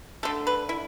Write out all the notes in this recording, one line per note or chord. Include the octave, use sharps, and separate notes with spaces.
D3 A3 A4
B4
E4